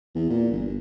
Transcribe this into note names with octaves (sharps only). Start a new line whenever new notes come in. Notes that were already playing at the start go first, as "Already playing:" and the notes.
E2
A#2
G1